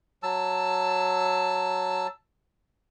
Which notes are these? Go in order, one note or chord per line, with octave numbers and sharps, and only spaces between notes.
F#3 A5 E6